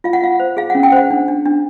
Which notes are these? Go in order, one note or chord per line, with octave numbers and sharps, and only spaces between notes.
F4 F5
F#5
F4 F5
C5
G#4 F5
C#4 F#5
G5
C5 F#5
D4
D4
D4